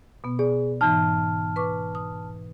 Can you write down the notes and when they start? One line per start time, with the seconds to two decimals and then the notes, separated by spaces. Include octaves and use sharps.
0.24 B2 B3
0.39 G#4 D5
0.81 G#2 E3 D#4 A5 F6
1.56 B4 C#6 D6
1.95 D#6